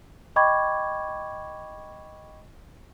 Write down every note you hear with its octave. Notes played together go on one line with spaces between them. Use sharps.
D#5 G5 B5 C#6 D6 G#6